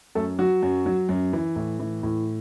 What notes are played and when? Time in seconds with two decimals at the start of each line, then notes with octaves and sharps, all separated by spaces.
0.15 F#2 A3 A4
0.39 F#3 F#4
0.63 F#2
0.86 F#3
1.09 F#2
1.33 E3
1.56 A2
1.79 E3
2.03 A2